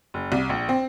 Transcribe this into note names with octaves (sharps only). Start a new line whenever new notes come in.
F#1
C2
A#1
C4